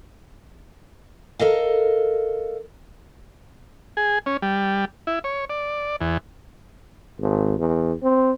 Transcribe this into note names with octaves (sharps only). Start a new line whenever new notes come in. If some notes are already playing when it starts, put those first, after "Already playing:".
A4 A#4 D#5 F5
G#4
C#4
G3
E4
C#5
D5
E2
G#1
E2
C4